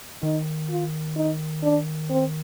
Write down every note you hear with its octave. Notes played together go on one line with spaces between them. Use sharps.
D#3 D#4
F4
D#4
D4
C4